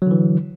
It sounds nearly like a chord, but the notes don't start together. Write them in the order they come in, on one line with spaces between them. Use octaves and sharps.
F#3 D3 E3